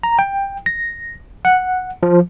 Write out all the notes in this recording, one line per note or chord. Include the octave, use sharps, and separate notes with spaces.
A#5
G5
A#6
F#5
F3